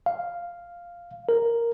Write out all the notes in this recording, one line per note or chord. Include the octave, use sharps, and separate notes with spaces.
F5
A#4